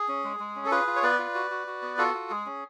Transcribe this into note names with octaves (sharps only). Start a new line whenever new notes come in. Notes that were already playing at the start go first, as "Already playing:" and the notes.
Already playing: G#4
C#4
G#3
G#3
C#4
A4
F4 G#4 B4
F4
C#5
B3 B4 D5
F4
F#4
F#4
F#4
B3
F4 F#4 A4
F4
G#3 G#4
C#4